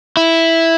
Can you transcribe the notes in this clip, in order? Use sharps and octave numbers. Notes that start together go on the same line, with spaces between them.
E4